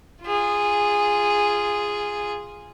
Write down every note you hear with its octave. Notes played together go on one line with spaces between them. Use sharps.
F4 G#4